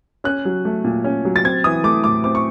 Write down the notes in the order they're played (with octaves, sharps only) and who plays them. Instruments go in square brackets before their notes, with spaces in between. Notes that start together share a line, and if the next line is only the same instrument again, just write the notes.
[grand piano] C#4 [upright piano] F#6
[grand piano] F#3
A3
A#2
C#4
F#3
[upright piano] A6
[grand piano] C4 [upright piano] G#6
[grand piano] E3 [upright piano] D#6
[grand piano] A3 [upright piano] D6
[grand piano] A2 [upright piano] D6
[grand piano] C4 [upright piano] D6
[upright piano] C#6